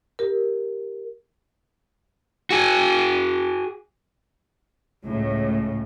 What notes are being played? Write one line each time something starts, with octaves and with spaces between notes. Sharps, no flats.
G4 A#4
F#4 G#4
C#2 A2 C#3